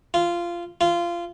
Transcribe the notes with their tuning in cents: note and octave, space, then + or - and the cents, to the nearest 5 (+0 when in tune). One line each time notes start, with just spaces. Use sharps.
F4 -15
F4 -20